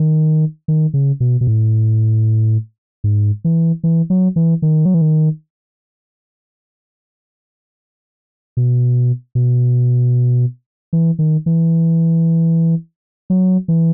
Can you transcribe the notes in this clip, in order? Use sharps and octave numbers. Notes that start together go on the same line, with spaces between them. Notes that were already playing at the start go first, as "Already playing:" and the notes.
Already playing: D#3
D#3
C#3
B2
B2
A2
G#2
E3
E3
F#3
E3
D#3
F#3
E3
D#3
B2
B2
E3
D#3
E3
F#3
E3